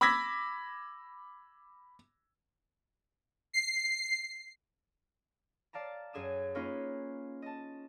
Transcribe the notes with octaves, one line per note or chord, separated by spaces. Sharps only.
B5 D6 E6 G#6 A#6 B6
C7
D5 F5 A5 A#5
F#2 G#4 D#6 E7
A#3 C#4 D#4 F4 B4
D#5 A5